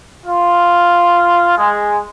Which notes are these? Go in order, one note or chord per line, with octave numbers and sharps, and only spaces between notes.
F4
G#3